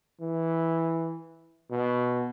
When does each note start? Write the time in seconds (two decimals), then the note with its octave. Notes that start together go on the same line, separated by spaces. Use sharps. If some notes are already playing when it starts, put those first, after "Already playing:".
0.21 E3
1.70 B2